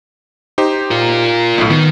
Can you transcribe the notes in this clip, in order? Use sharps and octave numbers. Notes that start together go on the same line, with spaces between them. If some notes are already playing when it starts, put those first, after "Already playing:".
D#4 G4 C5
F4 A#4
B1 A2
D#3 B3